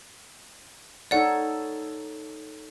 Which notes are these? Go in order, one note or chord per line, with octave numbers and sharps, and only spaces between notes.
D#4 A4 C#5 D5 F#5